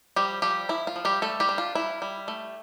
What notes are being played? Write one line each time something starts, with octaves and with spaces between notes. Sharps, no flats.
F3 G3 G4
F3 G3 G4
F3 E4
F4
F3
G3 G4
G3 A3 A4
G3 G4
D4
F4
G3 E4
G3
A3